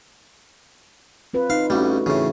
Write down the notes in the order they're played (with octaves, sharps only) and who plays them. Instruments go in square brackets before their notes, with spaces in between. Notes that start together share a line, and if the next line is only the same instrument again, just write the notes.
[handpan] C4 F4 B4
[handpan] D#4 [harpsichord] F5
[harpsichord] A1 G3 [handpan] A3 F#4
[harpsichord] A2 C#3 [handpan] E3